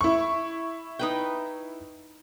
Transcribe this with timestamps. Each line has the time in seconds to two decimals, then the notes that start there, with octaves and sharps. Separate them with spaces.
0.01 E4 C#6
0.99 D#4 B4 G5